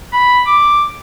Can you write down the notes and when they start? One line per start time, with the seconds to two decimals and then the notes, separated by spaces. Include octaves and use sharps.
0.13 B5
0.47 D6